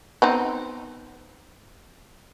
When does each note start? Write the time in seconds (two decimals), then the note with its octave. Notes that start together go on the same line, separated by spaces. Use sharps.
0.22 B3 C4 D#4